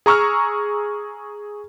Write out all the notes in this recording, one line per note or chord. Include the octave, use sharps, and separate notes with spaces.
G#4 A#5 C#6 E6 F6